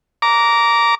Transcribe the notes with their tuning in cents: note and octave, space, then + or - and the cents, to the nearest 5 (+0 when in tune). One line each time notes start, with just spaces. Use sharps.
A#5 +0 D6 -20